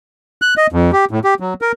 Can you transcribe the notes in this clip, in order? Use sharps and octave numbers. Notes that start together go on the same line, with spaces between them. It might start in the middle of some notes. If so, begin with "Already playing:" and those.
F#6
D#5
F2
G4
A2
G4
F#3
A#4